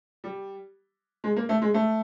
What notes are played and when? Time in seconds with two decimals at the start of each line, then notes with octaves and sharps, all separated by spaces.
0.24 G3
1.24 G#3
1.36 A#3
1.49 A3
1.62 G#3
1.74 A3